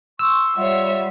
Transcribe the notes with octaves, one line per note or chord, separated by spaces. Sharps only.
C6 C#6 E6
G3 F4 C#5 E5 F#5